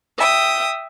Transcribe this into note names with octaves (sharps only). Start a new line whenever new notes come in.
E5 G5 D#6